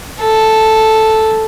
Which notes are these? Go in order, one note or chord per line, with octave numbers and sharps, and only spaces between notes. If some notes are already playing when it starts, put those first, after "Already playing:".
A4